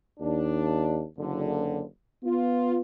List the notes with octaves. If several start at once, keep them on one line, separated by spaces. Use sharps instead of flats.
D#2 D4
F#1 D3
B3 F4